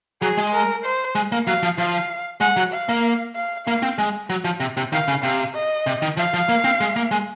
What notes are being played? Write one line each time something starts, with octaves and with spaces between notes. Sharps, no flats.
F#3 G#4
G#3
A#4
C5
G#3
A#3
F#3 F5
F3
F3 F5
G#3 F#5
F#3
F5
A#3
F5
A#3 F5
C4
G#3
F#3
F3
C3
C3
D#3 F5
C#3
C3 F5
D#5
C3
D#3
F3 F5
F3
A#3
C4
G#3
A#3
G#3